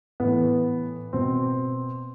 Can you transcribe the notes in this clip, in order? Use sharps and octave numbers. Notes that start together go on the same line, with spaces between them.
A2 B3
E3
B2 C4